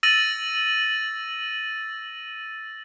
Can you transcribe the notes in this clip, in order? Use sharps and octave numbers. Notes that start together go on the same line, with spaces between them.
E6 A6 A#6 D#7 F#7